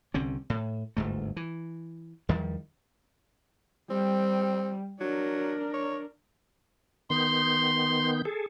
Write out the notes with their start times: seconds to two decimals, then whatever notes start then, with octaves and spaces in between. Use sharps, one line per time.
0.14 C2 D3 C4 C#4
0.50 A2
0.97 G1 D2 G#2 A3
1.36 E3
2.29 E2 D#3 F3 G3
3.90 G3 C4
5.01 F#3 D4 A#4
5.74 C#5
7.10 D#3 B3 C6 G6
8.25 G#4 A4